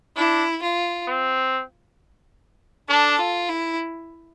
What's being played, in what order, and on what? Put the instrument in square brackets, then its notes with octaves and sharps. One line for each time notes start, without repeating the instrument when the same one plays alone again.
[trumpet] D4 [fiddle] E4
[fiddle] F4
[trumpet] C4
[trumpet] D4 [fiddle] A4
[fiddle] F4
E4